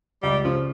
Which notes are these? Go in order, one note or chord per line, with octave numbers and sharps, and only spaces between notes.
C#2 G3
C#3 F3